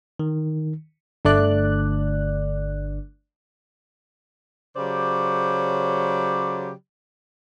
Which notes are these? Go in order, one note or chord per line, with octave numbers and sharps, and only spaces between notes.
D#3
G1 D3 A3 D4 D5 F#6
C#3 F#3 G4 C5 D5